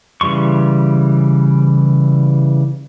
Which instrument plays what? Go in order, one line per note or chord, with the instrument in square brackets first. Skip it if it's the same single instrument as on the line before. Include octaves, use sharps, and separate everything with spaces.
[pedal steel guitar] C#3 E3 G3 C6 C#6